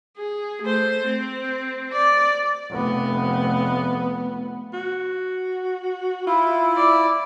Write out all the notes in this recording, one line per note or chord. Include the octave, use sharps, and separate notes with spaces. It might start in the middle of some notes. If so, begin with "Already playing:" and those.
G#4
A3 C5
C4
D5
F1 B3
F#4
E4 F4
D5